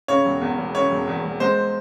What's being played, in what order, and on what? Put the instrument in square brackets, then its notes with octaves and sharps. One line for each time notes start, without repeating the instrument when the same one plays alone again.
[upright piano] C#3 [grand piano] C#5
[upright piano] E1
E2
E1
[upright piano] C#3 [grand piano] C#5
[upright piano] E1
E2
E1
[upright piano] G#3 [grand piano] C5